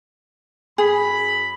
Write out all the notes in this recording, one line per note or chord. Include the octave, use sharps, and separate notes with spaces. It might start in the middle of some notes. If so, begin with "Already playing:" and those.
F#2 G#4 B5